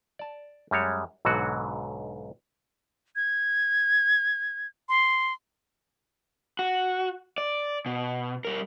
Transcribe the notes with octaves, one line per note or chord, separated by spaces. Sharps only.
D5 A5
F#2 G3 G#3 C#5
B1 G#2 B2 D3 F#3 F#4
G#6
C6
F#4
D5
B2
G3 A#4